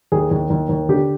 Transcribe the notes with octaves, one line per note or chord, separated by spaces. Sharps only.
D#2 G#4
D#2
D#2
D#2
D3 G4